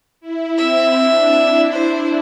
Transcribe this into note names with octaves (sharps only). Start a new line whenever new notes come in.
E4
C4 E5
D4
E4
C5